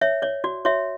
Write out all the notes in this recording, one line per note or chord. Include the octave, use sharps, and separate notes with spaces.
C#5 E5
C#5 D5
F#4 D5
F#4 C#5 E5